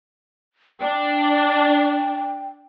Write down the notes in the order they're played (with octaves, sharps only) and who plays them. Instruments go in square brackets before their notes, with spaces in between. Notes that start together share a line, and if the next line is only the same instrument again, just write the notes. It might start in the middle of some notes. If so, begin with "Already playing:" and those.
[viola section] D4 [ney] G5